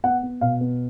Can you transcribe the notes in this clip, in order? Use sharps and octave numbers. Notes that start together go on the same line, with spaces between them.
B3 F#5
B3
B2 F5
B3